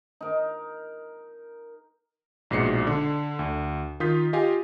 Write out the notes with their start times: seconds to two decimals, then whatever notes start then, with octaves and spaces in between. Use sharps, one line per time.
0.21 D#4 A#4
2.51 A#1 G#2 B2 C7 C#7
2.87 D3
3.39 D2
4.00 D#3 F4 F5 D#6 G6 B6
4.33 F4 G4 D#5 F5 G#5